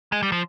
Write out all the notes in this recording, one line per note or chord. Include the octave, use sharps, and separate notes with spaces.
G#3
G3
F3